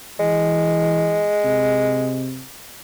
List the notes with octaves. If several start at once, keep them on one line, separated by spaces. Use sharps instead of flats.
E3 G#3
C3